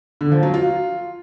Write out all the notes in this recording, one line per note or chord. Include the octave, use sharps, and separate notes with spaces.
D3
F3
F#3
F4